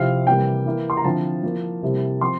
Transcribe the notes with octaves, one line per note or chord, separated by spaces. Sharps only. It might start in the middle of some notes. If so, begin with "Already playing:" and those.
Already playing: C3 F3 C4 E4 F5
C3 E3 G3 A#3 G5
E3 A#3 E4
C6
A#5
D3 F3 C4 E4 A5
F3 A#3 E4
C3 G3 A#3 E4
F3 C4 C6